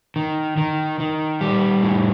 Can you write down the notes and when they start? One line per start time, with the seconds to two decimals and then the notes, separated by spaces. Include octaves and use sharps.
0.16 D#3
0.57 D#3
1.00 D#3
1.41 G3
1.83 A2